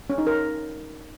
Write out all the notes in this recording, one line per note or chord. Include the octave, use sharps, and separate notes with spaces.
C#4
D#4
A#4